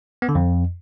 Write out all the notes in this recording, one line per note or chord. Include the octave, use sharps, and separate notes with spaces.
B3
D3
F2